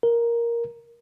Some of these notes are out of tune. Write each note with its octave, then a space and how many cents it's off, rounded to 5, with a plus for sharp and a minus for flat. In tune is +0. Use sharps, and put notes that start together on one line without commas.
A#4 +5